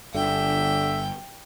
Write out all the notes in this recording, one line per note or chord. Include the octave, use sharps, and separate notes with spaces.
G1 D3 E5 G5